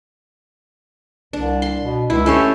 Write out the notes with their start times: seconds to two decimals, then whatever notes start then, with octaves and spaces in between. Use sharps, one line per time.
1.33 C2 D4
1.62 C6
1.82 B2
2.10 C#2 E4
2.26 A3 C#4 G4 C5